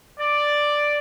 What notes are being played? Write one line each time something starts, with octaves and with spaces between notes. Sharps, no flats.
D5